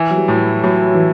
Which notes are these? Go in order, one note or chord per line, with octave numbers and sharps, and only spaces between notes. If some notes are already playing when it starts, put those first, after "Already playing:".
Already playing: E3
F#3
G3
A2
F#3
A2 F#3
E3